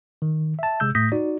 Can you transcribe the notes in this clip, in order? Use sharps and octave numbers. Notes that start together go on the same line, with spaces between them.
D#3
E5 A5
C3 G#3 E6 G6
A2 A3 D#6 G6 A#6 B6
D#4 F#4 D5